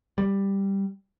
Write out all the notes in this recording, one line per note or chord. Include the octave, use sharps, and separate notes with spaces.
G3